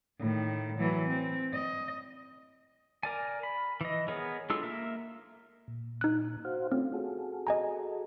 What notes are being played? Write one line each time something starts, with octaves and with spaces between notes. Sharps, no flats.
A2 D#3
E3 F#3
C4
D#5
A#4 D5 G#5
B5
E3 D#5
B3 G#4 A#4 C#5
G#3 D4 F4 A4 E6
A#3 A#4 E5
A#2
D#4 F#6
F#4 C5 F5
A3 C4 C#4 F4
F#4 G#4 A4
D#5 G#5 A#5